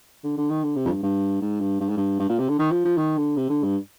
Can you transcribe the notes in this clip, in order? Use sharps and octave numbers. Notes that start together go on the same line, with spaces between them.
D3
D3
D#3
D3
C3
F2
G2
G2
G#2
G2
G2
G#2
G2
G2
A#2
C3
D3
D#3
F3
F3
D#3
D3
C3
D3
G2